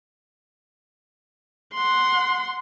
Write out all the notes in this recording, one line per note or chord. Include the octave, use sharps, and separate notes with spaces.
F#5 C6